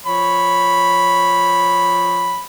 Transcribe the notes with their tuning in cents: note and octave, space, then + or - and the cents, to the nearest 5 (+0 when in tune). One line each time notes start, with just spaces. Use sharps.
F3 +0 C#5 +0 B5 +0